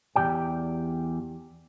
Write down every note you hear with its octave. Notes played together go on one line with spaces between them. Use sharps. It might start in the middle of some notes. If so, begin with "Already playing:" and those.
E2 F3 G4 D5 G5